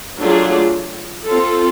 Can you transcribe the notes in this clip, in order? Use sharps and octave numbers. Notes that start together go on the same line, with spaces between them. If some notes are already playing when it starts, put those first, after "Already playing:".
F#3 A3 D4 F4 G#4
C4 F4 A4